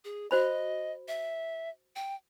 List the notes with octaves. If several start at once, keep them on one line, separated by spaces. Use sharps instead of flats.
G#4
F#4 C5 D#5 B5
E5
G5